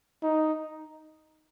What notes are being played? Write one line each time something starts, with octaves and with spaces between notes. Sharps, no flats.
D#4